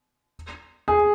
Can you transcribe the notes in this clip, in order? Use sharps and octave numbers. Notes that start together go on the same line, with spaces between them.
G#4